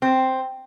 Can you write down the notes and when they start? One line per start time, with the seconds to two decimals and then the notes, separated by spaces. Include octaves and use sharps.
0.02 C4